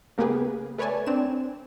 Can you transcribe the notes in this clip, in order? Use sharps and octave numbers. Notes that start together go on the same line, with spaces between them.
C#3 A#3 B3 G4 G#4 B4
A3 B4 C#5 D5 G#5 A5
C4 D4 E7